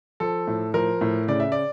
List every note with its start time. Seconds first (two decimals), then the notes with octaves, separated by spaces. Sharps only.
0.20 F3 A4
0.47 A2
0.74 F3 A#4
1.01 A2
1.28 C#3 D5
1.40 E5
1.52 D5